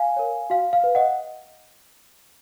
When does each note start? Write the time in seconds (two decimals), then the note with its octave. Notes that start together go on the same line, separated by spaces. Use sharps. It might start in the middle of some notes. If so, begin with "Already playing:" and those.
Already playing: F5 G#5
0.16 A#4 C#5
0.50 F#4 F5
0.73 F5
0.84 B4
0.95 D#5 F#5